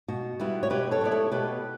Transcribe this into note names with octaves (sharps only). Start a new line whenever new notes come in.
B2 F#4
G3 B3 E4
C#5
B2 G4 B4
A4 C#5
G3
B3 E4 D5
A4 C#5
B2 G4 B4